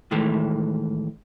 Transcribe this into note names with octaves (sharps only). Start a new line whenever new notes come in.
A2 D#3 E3 G#3 A3